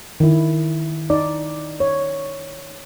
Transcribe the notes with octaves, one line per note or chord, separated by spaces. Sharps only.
D#3 E4
D#4 D5
C#5